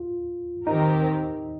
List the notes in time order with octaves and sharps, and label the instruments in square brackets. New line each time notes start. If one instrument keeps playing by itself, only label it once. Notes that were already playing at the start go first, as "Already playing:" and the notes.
Already playing: [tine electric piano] F4
[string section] D#3 C4 G4 A#4 [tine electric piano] D#4